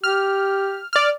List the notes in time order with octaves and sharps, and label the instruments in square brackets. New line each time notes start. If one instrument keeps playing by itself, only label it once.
[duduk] G4 [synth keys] F6
[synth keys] D5 F6